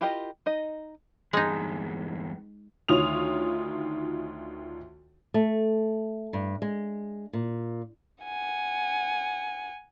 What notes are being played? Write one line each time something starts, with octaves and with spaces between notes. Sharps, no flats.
E4 F4 G4 A#4 D#5
D#4 D#5
E2 G2 G#3 D#4
D2 D#3 F4 C#5 D#6 F7
A3
G2
G#3
A#2
F#5 G#5